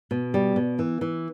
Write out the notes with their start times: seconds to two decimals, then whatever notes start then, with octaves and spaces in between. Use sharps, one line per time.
0.11 B2
0.34 G3
0.56 B2
0.79 E3
1.01 E3